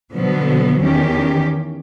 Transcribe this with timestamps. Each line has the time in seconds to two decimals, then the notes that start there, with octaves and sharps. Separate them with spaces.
0.12 B2 D3 F3 F#3 B3
0.80 E2 D#3 C#4 G4